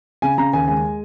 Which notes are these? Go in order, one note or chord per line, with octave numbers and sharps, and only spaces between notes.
C#3 G#5
C#3 A#5
D#2 G#5
G#3 G#5